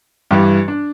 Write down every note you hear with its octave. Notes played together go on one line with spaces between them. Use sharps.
G2 E3 G3 G4
D4